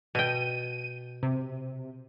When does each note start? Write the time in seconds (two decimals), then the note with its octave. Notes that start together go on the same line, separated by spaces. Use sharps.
0.15 B2 G5 D#7
1.23 C3